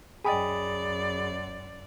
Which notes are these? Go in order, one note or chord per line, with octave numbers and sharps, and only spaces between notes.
F#2 G#4 D5 D#5 G5 G#5 B5 D#6